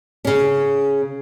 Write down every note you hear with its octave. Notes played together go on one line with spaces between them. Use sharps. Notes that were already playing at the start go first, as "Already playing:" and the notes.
C#3 C#4